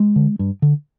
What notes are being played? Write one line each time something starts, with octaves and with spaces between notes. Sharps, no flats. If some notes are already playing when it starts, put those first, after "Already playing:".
Already playing: G#3
D3
G2
D3